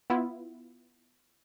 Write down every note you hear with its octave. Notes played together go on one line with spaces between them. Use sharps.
B3 E4 F4